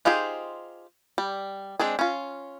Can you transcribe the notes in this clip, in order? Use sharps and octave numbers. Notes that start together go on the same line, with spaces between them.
D#4 F4 G4 G#4 C5
G3
G#3 C4 D4 G#4
C#4 F4